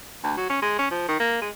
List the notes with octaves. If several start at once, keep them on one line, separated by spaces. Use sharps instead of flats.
D2
F#3
C#4
G#3
C#4
F3
D#3
A#3
G#3